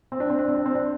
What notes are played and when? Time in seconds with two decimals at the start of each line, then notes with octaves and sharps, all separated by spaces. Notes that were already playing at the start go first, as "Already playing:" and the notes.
0.12 C4
0.20 D4
0.30 C4
0.39 D4
0.48 C4
0.56 D4
0.66 C4
0.75 D4